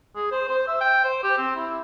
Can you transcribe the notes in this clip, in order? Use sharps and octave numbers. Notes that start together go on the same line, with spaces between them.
G#4
C5
C5
E5
G5
C5
G4
C4
E4